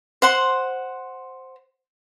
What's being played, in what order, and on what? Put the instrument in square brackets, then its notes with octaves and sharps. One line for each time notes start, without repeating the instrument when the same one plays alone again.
[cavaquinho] C5 F#5 C6